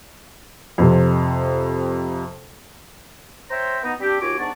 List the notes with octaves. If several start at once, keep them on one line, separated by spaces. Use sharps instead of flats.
F2 C3
C5 C#5 E5 G5 A#5 C6
B3 D#4
G3 C4 D4 G4
D#2 F4 F#4 G#5 D6
G#2 B3 D4 D5 A5 C#6